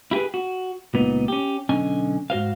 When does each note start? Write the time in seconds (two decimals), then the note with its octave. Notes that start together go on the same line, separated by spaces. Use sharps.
0.11 E4 G4 G#4 B4
0.34 F#4
0.94 C#2 A#2 B3 D#4
1.28 C#4 G4
1.69 B1 D3 C#4 D#5 G#5
2.30 G#2 F#4 C5 F5